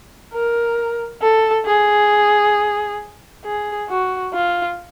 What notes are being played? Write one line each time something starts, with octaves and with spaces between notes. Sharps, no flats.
A#4
A4
G#4
G#4
F#4
F4